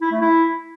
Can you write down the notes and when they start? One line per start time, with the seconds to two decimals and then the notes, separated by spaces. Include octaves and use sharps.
0.02 E4
0.12 A3
0.21 E4